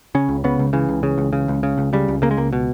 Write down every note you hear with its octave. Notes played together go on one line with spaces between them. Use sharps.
C#3 C#4
C#2
C#3 B3
C#2
C#3 E3
C#2
C#3
C#2
C#3
C#2
C#3
C#2
C#3 G3
C#2
C#3 A#3
G#3
C#2 A#3
B2